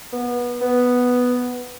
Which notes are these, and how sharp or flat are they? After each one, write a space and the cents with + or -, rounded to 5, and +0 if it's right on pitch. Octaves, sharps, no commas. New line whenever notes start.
B3 -25
B3 +0